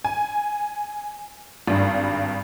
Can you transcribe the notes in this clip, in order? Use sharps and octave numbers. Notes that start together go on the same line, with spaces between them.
G#5
G#1 G2